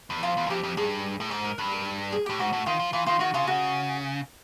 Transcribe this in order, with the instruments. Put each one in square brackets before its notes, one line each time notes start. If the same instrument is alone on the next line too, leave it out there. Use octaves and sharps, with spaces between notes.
[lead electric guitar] E2
[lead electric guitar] F2 [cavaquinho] F4
[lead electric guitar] E2
F#2
[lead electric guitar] F2 [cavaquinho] G4
[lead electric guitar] F2
[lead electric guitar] G2 [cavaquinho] G#4
[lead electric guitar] A2
[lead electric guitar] G#2 [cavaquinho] A4
[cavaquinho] A#4
[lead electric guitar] G2 [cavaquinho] B4
[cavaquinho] A#4
A4
A4
G#4
[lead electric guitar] A2 [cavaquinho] G4
[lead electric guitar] G#2 [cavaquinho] F#4
[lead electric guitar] A2
[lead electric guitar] D#3 [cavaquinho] F4
[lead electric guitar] F3
[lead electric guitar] E3 [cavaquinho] F4
[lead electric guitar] D#3 [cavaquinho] F4
[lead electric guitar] D#3 [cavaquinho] F#4
[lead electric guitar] C#3 [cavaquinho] F4
[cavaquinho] F#4